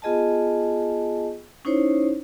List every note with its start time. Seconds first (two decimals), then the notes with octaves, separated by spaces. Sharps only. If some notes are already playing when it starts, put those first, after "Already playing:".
0.02 B3 F4 G#4 D#5 G#5 A5
1.65 C#4 D#4 E4 C5 C#5